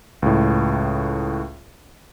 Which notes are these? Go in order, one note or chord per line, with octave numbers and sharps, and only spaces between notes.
C#2 A2